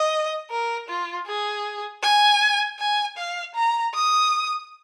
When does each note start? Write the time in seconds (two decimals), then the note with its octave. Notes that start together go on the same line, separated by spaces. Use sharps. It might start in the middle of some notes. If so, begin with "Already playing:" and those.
Already playing: D#5
0.50 A#4
0.88 F4
1.27 G#4
2.03 G#5
2.79 G#5
3.17 F5
3.55 A#5
3.94 D#6